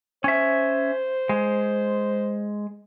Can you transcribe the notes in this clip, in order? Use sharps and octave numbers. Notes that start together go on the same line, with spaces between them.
C#4 C5 E5
G#3